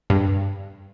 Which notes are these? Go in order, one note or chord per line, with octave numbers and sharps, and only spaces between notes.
G2